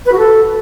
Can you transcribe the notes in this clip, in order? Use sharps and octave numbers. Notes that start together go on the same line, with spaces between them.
B4
F#4
A4